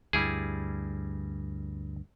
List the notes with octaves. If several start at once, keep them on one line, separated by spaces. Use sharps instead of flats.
D2 G2 G3 E4 G#4